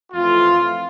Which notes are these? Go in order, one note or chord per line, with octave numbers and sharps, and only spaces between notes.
F2 E3 A3 C4 F4